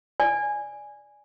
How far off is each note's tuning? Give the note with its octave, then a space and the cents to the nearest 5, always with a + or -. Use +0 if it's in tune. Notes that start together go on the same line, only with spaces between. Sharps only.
D5 +0 G#5 +0